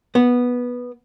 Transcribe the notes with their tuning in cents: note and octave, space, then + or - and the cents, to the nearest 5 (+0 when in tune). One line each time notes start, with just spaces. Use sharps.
B3 -10